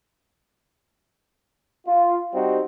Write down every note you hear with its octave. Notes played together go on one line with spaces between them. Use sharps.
F4
G3 C4 D#4 F#4 G4